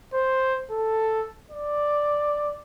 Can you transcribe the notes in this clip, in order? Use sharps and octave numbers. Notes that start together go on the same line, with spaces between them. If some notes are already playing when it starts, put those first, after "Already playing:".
C5
A4
D5